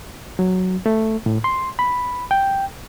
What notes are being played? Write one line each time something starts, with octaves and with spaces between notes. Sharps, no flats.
F#3
A3
A2
C6
B5
G5